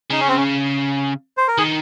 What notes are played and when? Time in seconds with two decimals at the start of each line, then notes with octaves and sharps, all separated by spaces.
0.11 C#3 D#4
0.20 C#4
0.28 C4
0.37 C#4
1.37 C5
1.48 A#4
1.58 D#3 G#4